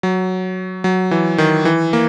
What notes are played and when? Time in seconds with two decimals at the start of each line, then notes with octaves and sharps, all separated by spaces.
0.03 F#3
0.84 F#3
1.11 E3
1.38 D#3
1.65 E3
1.93 A#3